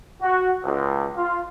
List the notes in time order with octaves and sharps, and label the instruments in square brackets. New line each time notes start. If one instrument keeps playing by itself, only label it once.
[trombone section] F#4
C#2
F4